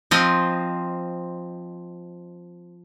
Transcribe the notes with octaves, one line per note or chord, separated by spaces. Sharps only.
F3 C4 D#5